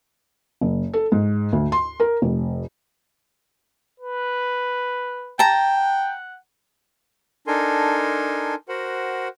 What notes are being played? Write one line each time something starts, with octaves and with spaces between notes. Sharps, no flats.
F#1
A4
G#2
D2
C6
A#4
F1
B4
G5 A5 A#5
F#5
D4 D#4 A4 A#4 G#5 C6
F#4 A#4 C5 F#5